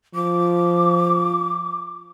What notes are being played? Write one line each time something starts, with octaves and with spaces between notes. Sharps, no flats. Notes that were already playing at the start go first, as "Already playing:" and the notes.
F3 D6